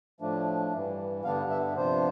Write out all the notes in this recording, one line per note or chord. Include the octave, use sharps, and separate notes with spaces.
A2 F3 A3 D4
G2 E3 G3
G2 D3 G3 B3 D4 F5
E5
C3 F3 B3 D4 C5